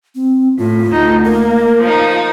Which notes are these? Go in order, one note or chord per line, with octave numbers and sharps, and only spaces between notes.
C4
A2 F4
D2 D#4
A#3 A#4
F3 D#4